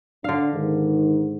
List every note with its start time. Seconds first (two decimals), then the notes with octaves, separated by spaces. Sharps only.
0.24 D3 D4 F5
0.54 G#2 D#3